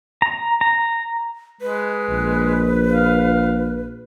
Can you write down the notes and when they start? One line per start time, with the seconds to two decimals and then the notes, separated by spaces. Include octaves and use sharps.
0.22 A#5
0.61 A#5
1.61 G#3 B4
2.09 A#1
2.93 F5